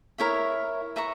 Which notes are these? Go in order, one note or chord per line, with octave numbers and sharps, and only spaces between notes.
E4 A#4 C#5 E5
B4 E5 A#5 C#6